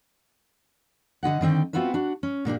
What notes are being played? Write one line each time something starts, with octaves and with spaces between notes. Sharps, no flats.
D3 F4 D#5 F#5
D3 D#3 C4 G5
B3 C4 F4 F#4 B4 E5
D4 F#4
C#4
A#2 A#3 D4 G4